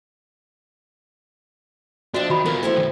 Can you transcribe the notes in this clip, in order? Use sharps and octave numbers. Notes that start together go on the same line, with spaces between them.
F2 D4 F#4 E5
D#3 F#4 B5
B3 F4 A#4
F3 A3 C4 E4
F#2 D#3